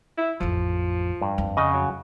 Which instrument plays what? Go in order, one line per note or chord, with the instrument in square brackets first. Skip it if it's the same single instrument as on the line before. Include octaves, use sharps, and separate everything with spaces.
[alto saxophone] E4
[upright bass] A1 F2 [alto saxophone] F3
[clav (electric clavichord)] G2
[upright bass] F2
[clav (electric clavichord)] C#3 F#5 A#5 [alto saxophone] D#5
[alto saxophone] F#3